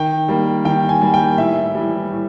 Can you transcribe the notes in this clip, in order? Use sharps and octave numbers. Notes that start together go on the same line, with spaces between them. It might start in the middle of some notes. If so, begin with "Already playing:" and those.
Already playing: D#3 G5
G3 A#3
D#3 G5
G#5
G3 A#3
G5
A2 E5
E3 G3
A2